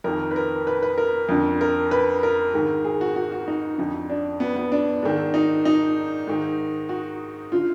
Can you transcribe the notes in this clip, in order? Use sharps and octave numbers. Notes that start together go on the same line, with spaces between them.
F2 D#3 A#4
B4
A#4
B4
B4
A#4
F2 D3
A#4
B4
A#4
G#2 D#3
G#4
F#4
F#4
F#4
D#4
F2 D3
D4
B3
B3
D4
G#2 D#3
D#4
D#4
G#2 D#3
F#4
D3 F4